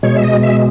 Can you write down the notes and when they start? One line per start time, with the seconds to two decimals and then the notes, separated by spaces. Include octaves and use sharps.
0.03 B2 G#3 C#5
0.17 E5
0.23 D#5
0.43 E5